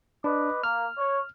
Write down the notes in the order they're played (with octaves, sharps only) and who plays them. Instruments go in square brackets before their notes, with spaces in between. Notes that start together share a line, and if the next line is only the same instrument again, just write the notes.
[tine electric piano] D4 [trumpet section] B4 D#5 D6
[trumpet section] A#3 [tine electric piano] F6
[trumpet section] C#5